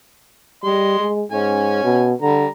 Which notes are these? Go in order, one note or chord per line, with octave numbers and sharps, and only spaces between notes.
G3 D#5 C6
G#3
G#2 C#4 G#5
B2
D3 G3 A#5